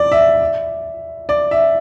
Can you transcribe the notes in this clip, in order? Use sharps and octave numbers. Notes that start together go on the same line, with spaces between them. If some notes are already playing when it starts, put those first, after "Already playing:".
Already playing: D5
E5
D5
E5